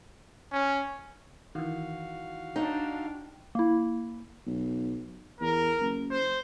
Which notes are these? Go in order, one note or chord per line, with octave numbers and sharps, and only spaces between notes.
C#4
D#3 E3 F#4 F5
D4 D#4 G5
A#3 E4
B1
E2 A#4
F#1
C5